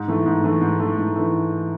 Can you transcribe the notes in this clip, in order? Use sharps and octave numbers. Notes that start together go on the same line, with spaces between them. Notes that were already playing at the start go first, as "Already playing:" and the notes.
Already playing: G#2
E3 A3
G#2
E3 A3
G#2
E3 A3
G#2
E3 A3